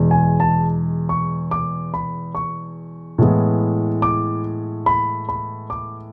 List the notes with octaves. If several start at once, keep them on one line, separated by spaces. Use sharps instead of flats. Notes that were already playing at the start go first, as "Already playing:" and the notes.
Already playing: E2 B2 G#3
G#5
A5
C#6
D6
B5
C#6
A2 E3 G#3 B3
D6
B5
B5
D6